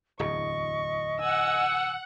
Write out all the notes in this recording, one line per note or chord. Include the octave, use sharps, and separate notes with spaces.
D1 E2 D#5 C#6
F#5 G#5 E6